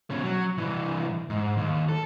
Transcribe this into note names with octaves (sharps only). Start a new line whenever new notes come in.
B2 C#4
F#3
C2 E3
G#2
D#2
A4